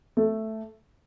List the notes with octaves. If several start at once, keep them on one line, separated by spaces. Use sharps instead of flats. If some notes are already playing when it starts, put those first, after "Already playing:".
A3